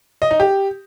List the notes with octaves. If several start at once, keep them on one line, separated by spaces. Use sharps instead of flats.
D#5
D#4
G4